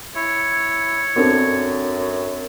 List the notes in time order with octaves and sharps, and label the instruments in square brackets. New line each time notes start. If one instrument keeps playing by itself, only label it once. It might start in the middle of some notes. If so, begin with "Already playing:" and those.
[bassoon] E4 [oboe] C#5
[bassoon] F#2 [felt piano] C4 D4 A4